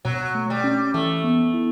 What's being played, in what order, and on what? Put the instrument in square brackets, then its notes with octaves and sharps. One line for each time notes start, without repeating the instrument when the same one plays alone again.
[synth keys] B2 [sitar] F#3
[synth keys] A3
[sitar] G3
[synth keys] C#4
[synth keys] E3 [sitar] A3
[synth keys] B3
E4